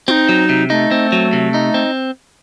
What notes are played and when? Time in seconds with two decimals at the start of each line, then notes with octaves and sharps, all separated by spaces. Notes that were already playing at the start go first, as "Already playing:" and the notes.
0.07 C4 D#4 F#4
0.29 F#3
0.49 C3
0.70 A3 D#4
0.91 C4
1.12 F#3
1.33 C3
1.54 D#4
1.74 C4